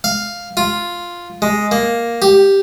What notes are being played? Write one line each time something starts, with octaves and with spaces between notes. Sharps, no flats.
F5
F4
G#3
A#3
G4